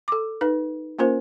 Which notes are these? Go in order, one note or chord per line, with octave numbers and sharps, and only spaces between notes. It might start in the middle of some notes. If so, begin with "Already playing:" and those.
A4 D6
D#4 B4
A#3 C#4 F4 A#4 C5